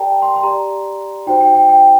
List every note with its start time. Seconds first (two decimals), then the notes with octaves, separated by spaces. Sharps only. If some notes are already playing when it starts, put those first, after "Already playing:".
Already playing: G4 A#4 D5 G5 A5 A#5
0.22 C6
0.36 C6
0.43 G4 D5 A#5
1.27 D#4 F#4 C5 G5
1.41 G5
1.55 G5
1.69 G5